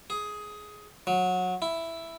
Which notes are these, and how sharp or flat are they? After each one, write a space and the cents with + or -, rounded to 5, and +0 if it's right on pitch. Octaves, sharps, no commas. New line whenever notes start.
G#4 +10
F#3 -20
E4 +5